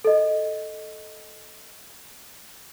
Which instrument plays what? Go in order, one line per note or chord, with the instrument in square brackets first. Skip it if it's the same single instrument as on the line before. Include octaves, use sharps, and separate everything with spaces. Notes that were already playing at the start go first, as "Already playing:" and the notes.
[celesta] A4 D#5